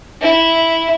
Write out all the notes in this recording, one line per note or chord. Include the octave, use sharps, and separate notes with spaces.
E4